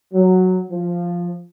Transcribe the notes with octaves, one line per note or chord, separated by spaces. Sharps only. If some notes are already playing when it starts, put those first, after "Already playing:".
F#3
F3